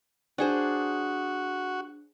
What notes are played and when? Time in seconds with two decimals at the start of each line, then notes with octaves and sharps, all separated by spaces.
0.38 D4 F#4 G#4 C5